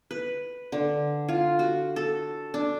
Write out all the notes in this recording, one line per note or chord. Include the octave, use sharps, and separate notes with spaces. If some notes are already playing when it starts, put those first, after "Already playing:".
B4
D3
F4
F#4
A4
D4